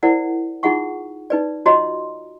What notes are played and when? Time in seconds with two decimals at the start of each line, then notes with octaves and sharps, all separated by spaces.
0.03 E4 A#4 C5 D5 F#5
0.63 D#4 F4 G#4 E5 F#5 C#6
1.30 D#4 B4 D5
1.66 F4 F#4 C#5 D#5 A#5 C6